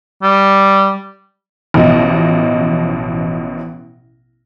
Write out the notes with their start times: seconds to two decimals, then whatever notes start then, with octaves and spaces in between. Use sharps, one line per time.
0.23 G3
1.74 A1 B2 F3 D#5